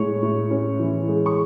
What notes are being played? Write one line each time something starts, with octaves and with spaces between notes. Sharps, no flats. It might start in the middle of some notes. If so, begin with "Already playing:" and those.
Already playing: A2 G#3 C#5 C#6
A2
C#4
E3
G#3
C#6